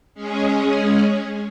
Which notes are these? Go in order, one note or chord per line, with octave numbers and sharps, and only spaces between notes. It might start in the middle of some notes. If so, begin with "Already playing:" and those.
G#3 C#4 G#4